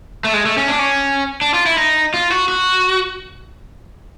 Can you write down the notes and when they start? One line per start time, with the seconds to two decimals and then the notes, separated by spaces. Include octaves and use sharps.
0.24 A3
0.34 G#3
0.46 A3
0.58 C#4
0.68 D4
0.79 C#4
1.41 D4
1.54 F4
1.66 E4
1.78 D#4
2.14 F4
2.32 F#4
2.49 F#4